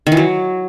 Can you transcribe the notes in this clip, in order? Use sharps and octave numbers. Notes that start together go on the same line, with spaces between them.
D#3
E3
F#3